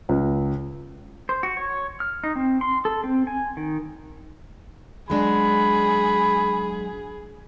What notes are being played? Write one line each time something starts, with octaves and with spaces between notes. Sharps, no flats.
C#2
C5
F#4
C#5
F6
D#4
C4
C6
A4
C4
G#5
D#3
F#3 G#3 D4 G#4 B5